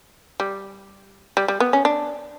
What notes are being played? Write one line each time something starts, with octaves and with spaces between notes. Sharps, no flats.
G3
G3
G3
B3
C#4
D4